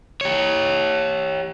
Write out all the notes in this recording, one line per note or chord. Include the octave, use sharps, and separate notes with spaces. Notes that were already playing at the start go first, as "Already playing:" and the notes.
G4 C#5